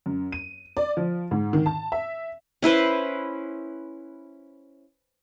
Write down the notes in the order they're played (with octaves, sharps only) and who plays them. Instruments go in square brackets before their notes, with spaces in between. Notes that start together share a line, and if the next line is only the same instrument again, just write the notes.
[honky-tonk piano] F#2
D#7
D5
F3
G#2
D#3
A5
E5
[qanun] C#4 E4 B4 C5